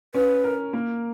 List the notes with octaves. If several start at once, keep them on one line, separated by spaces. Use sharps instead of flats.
C#4 B4
A#4
A#3